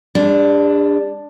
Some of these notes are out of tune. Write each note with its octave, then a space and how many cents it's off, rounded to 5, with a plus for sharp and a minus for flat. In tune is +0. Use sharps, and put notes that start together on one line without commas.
G#3 -45 D4 +0